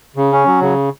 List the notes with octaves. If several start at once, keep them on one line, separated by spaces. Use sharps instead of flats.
C#3
C#4
F#3
C#3